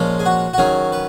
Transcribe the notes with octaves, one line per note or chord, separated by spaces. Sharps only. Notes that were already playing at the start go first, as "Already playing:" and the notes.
Already playing: A#2 F3 G#3 C#4
G#4
F#4
F#4
D#3 F#3 C#4 G#4
B4